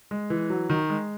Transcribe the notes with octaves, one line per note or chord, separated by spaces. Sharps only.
G#3
E3
F#3
D#3
G#3